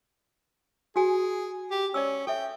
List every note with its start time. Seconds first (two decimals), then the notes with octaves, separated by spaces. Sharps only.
0.96 F#4 G#4 G#5
1.71 G4
1.94 C#4 D5 E6
2.27 A4 E5 G5